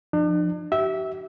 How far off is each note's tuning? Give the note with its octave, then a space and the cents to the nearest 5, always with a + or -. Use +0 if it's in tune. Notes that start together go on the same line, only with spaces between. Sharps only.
F3 +0 D4 +45
G4 -40 E5 -15